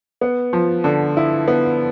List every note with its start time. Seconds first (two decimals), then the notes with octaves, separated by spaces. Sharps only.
0.21 B3
0.53 F3
0.84 D3
1.17 E4
1.48 B3